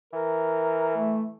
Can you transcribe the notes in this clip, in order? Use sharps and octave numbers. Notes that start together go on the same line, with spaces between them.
E3 A#4
A3